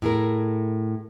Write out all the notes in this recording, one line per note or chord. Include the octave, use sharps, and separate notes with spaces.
A2 E4 G#4 A#4